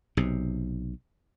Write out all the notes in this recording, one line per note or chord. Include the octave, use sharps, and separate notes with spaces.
B1 C3